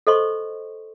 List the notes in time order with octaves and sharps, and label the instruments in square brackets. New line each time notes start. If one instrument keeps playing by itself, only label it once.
[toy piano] A4 C5 D#5 C6 C#6